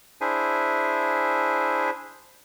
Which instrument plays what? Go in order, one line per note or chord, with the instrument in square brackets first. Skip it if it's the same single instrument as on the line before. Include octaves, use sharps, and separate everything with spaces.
[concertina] D4 E4 G#4 C5 E5 G#5